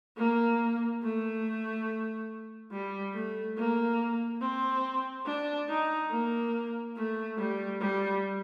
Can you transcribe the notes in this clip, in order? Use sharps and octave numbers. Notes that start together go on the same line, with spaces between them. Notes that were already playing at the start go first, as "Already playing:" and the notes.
A#3
A3
G3
A3
A#3
C4
D4
D#4
A#3
A3
G3
G3